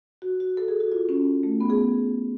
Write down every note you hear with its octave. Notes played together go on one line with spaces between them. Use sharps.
F#4
F#4
A4
G#4
F#4
F4
C#4
A3
B3
G#4